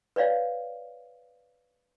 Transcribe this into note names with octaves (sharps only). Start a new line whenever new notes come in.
B4 C#5 D5 F5